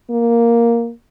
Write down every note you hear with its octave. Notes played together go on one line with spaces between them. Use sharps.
A#3